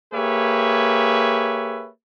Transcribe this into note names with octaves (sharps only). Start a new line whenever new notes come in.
A#3 G4 G#4 B4 C#5 E5